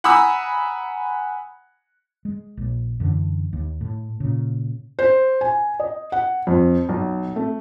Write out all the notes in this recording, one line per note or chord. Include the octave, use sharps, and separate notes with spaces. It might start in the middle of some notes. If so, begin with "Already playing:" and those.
F#5 G#5 A#5 B5 D#6 E6
G#3
A#1
F#2 D3 E3
D#2
A2
A#2 C#3
C5
G#5
D#5
F#5
F2
B1
A3